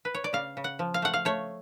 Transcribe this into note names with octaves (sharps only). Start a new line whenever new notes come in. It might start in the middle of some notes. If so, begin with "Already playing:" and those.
B4
C#5
D5
C#3 F5
C#3
F#5
F3
F5
A3 F#5
F5
A3 C#5